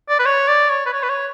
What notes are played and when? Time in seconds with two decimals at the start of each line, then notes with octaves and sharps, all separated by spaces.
0.09 D5
0.19 B4
0.26 C#5
0.48 D5
0.70 C#5
0.86 B4
0.93 C#5
1.03 B4
1.09 C#5